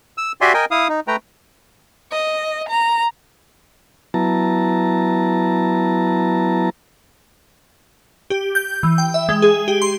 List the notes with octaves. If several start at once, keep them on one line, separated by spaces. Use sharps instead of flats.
E6
F#4 G4 D5 E5 G#5 C6
A#4 D#5 G5 G#5
E4 F5 D#6
D#4
A3 B4 G5 A#5
D#5
A#5
F#3 B3 E4 A5 A#5
G4
G6
E3
G5
E5
G#3
G#4
G4
C6